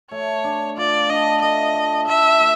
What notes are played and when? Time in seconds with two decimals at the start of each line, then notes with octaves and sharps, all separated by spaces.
0.11 A3 C#5
0.44 D4
0.77 F4 D5
1.10 D4 D#5
1.42 A3 D#5
1.74 A3
2.07 A3 E5
2.40 A3